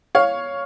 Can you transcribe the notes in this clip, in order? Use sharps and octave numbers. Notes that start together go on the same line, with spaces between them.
C#5 F5